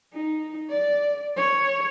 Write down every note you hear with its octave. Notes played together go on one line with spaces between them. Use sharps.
D#4
D5
C#5